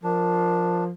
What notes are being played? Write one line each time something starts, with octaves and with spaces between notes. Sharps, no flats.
F3 D4 A#4